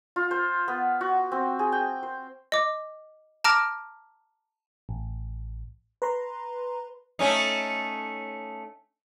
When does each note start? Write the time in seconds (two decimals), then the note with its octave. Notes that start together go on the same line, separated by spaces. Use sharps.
0.16 F4
0.31 C5
0.68 B3
1.01 F#4
1.32 C4
1.59 G#4
1.72 G5
2.03 C5
2.52 D#5 D6
3.44 A5 A#5 D6 F6 A#6 D7
4.89 A1
6.02 B4 A#5 C6
7.19 A3 C#4 D#4